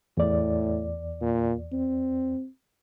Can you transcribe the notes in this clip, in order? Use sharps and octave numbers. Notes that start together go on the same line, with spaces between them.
E2 A2 D5
A#2
C4